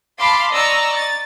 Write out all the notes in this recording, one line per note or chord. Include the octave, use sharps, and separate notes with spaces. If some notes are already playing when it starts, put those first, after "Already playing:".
F5 A5 B5 C6 D6
D5 D#5 A#5 C#6 E6
A6